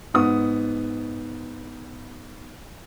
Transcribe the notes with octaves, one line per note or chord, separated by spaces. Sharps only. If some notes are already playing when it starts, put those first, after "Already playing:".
G#2 B3 D#6